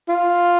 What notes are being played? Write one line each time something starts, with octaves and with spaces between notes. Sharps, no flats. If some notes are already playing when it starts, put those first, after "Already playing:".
F4